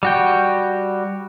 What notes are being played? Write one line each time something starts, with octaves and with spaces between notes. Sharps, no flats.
G3 F#4 G5